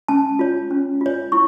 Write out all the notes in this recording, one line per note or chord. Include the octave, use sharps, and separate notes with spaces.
C#4 A5
F4 C#5
C#4
F4 C#5
E4 C#6